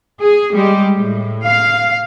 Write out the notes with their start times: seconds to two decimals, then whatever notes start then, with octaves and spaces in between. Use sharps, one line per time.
0.21 G#4
0.52 G3 G#3 G4
0.96 A2
1.45 F5